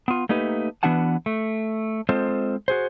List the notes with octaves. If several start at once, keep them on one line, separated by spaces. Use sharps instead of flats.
B3 F4
A3 A#3 D#4 G4 B4
E3 B3 D4 F#4 F#5 A5
A3
G#3 C4 F4 A4 C5 D#5
F#4 G#4 C5